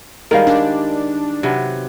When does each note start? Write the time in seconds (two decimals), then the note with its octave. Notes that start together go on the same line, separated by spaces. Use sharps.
0.31 D#3 G3 G#3 A#4 F5
0.47 D4
1.43 C3 F#3 B3